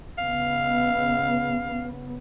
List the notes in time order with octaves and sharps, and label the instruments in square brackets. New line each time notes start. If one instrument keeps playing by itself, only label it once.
[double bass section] C#3 B3 [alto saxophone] F5